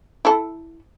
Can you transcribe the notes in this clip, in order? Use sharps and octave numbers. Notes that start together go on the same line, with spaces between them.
E4 A4